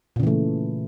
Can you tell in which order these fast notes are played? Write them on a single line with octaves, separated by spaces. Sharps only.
A#2 C#3 E3 A3